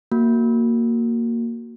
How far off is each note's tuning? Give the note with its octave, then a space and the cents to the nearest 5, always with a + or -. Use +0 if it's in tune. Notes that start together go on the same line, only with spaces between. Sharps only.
A#3 -5 F#4 +0